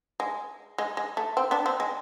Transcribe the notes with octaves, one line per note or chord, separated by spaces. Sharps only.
G#3
G#3
G#3
A3
C4
B3 D4
C4
G#3